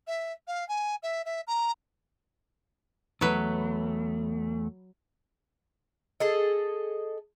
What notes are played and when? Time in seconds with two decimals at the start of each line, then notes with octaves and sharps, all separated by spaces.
0.07 E5
0.47 F5
0.68 G#5
1.02 E5
1.25 E5
1.47 A#5
3.21 E2 F#3 A3 B4
6.20 G#4 A4 D#5